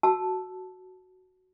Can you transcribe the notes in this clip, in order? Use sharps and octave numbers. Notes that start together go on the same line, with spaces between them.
F#4 A5 E6